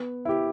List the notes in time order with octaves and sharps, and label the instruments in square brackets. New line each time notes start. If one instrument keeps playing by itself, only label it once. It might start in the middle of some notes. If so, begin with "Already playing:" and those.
Already playing: [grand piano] B3
E4 G4